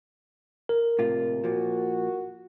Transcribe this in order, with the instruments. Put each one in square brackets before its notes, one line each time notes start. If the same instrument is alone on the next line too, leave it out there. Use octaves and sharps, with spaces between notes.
[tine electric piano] A#4
[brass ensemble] A#1 D#2 [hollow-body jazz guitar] A2 C3 F4
[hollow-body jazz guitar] A#2 F3 [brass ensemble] F#4